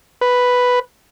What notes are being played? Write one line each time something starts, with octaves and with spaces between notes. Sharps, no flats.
B4